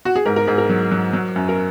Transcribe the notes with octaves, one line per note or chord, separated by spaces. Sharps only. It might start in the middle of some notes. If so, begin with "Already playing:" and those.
F#4
G#4
G#2 A#4
A#4
G#2 G#4
A#4
F#3
F#3
F#3
F#2
A#4